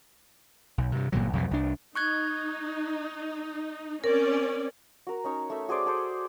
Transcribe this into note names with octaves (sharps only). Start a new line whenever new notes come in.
B1
G2 C3
G1 A#2 D3 F#3
B1 F2 C3
C2 D4
D#4 C#6 F#6 G#6
C4 C#4 A#4 D5
F#4 A#4
C#4 D#4 C#5
A3 E5
F#4 G#4 C5 D5
G#4 A4 C5 D5